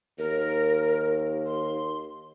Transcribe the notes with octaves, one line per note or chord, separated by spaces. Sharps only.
D#2 A#4
C6